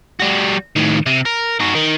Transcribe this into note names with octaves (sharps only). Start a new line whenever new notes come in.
G3 F#4
A2 D#3
C3
A#4
D#3 F#4
D#3